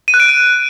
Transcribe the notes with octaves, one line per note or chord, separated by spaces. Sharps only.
D#7
F#6
D7